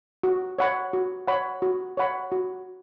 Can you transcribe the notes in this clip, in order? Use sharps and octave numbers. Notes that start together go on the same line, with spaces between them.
F#4
C#5 F#5 B5
F#4
C#5 F#5 B5
F#4
C#5 F#5 B5
F#4